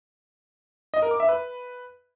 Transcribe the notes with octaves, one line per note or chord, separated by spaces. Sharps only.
D#5
A#4
D6
E5
B4